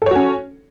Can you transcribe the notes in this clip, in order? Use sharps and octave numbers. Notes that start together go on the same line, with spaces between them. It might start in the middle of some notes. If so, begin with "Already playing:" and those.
C#4 F#4 A4 C#5